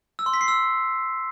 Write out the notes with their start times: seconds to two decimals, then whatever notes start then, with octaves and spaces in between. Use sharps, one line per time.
0.19 E6
0.26 C6
0.34 B6
0.41 C7
0.48 E6